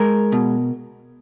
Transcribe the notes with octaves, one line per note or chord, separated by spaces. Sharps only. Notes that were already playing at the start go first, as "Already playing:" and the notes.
Already playing: G#3 A#4
B2